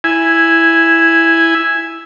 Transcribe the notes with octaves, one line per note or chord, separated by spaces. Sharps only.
E4 G#5